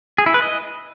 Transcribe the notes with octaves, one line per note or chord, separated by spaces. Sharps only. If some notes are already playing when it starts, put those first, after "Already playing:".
G#4
E4
B4
D#5